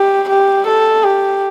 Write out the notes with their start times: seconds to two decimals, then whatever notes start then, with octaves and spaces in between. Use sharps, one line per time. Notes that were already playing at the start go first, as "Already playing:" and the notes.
Already playing: G4
0.29 G4
0.67 A4
1.03 G4